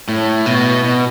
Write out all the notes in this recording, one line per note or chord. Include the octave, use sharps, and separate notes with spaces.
A2
B2
B2